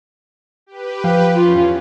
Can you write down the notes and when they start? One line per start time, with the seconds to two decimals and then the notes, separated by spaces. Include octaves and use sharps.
0.66 G4 B4
1.04 F3 F5 G5
1.36 E2 C#4 F4